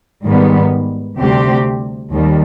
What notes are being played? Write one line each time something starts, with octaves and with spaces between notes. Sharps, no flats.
G#2 D#3 G3 B3
D2 C3 G3 C4 G4
D#2 D#3 G3